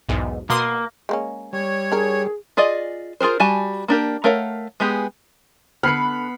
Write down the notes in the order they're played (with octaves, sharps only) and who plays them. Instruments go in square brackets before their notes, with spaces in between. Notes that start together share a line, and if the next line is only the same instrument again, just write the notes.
[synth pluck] B1 E2 G#2
[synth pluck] B2 C6 D#6 [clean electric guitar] A#3
[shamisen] G#3 A#3 C#4
[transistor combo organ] G3 [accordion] C#5
[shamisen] D4 A#4 [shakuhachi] G#4
[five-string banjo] F4 G#4 D5 D#5
F4 G#4 A#4 C5
G3 F#4 G#5 A5
A#3 D4 G4 A#4
A3 A#4 C#5 F5 F#5
G#3 B3 G4 G#4
[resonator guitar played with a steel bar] D3 B4 [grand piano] B3 [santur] B5 [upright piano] F6 C7 C#7